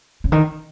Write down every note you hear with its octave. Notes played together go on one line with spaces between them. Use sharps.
C#3
D#3